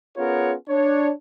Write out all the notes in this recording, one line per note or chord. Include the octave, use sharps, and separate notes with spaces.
B3 C#4 F4 G#4 A#4 C#5
D4 C#5